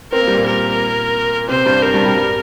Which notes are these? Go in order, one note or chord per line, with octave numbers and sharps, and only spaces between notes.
C4 A#4
A#3
G3
A#2 A#3
A#4
C3 C4 C5
G2 G3
A#4
G2 G3
G2 G3
G3